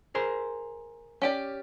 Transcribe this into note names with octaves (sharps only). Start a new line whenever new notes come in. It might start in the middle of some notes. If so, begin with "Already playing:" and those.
G#4 A#4 C5
C#4 G4 D5